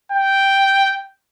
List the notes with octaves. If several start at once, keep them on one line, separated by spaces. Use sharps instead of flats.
G5